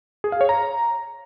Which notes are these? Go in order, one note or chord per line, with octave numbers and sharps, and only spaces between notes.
G#4
F5
C#5
A#5